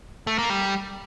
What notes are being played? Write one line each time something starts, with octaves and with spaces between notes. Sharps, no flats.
A3
A#3
G3